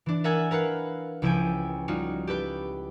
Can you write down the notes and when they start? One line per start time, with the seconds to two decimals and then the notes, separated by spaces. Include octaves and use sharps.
0.06 E3 D4
0.24 A#4 E5 F#5 G#5 G#6 A6
0.51 A#4 B4 F5 F#5
1.22 C#2 F3 E4 A4 G5 G#5
1.88 G3 D#4 F4 F#4
2.27 G4 A4 B4 G5